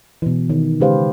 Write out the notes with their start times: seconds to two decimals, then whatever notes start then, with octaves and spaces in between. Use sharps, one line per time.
0.22 B2 E3
0.50 D#3
0.80 C#3 G#3 G4 B4 C5 F5